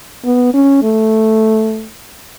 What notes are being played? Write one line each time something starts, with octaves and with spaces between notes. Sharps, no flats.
B3
C#4
A3